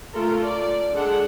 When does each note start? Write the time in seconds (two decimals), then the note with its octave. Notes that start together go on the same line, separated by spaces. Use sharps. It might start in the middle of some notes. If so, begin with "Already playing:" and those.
0.13 A3 F4 A4 A#4
0.43 D5
0.93 G#3 D4 A4 F#5